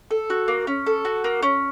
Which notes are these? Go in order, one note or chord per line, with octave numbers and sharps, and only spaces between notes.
A4
F#4
A#3
C#4
A4
F#4
A#3
C#4